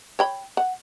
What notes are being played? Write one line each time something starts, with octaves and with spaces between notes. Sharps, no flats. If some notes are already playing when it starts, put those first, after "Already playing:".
C#5 G5 B5
F#5